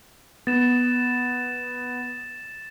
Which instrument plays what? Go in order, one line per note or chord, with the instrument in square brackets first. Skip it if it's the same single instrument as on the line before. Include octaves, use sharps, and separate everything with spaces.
[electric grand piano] B3 [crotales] A6 E7